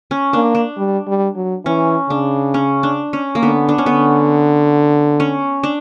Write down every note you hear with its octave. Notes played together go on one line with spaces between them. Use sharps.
C#4
A#3 D4
D4
G3
G3
F#3
E3 C#4
C#3 D4
C#4
D4
C#4
A#3
D3 B3
D4
C#4
D3 B3
C#4
D4